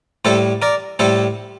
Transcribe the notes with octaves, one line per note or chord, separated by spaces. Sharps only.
A2 G3 A4 C5
A#4 D5
A2 G3 A4 C5